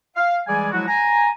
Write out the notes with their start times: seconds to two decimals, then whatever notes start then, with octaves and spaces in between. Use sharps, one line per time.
0.16 F5
0.47 E3 G3 G#3 G#4 D5 G#5
0.72 F3 F#3 G#3 E4 F#4
0.88 G#5 A#5